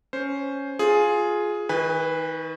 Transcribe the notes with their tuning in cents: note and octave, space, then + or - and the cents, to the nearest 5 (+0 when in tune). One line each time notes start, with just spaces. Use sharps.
C#4 +5 C5 +0
F4 +10 G#4 +10
D#3 +35 B4 +0 G#5 -35